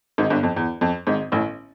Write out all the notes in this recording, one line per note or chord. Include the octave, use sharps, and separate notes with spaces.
G#1 G#2
G1 G2
F2
E2
F2
G#1 G#2
A1 A2